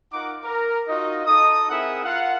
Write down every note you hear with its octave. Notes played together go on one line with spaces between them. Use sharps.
D#4 F4 A#4 F#5 D6
A#4
D#4 F4 F#4 D#5
D#4 A4 D#5 D#6
C4 E4 G#4 A#4 E5 F#5
F4 A#4 F5 F#5